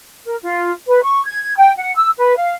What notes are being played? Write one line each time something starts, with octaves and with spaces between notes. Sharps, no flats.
A#4
F4
B4
C#6
G#6
G5
F#5
E6
B4
F5